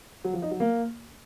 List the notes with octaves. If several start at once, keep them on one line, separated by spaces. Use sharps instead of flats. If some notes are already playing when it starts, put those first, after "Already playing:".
F#3
F3
D#4
F#3
A#3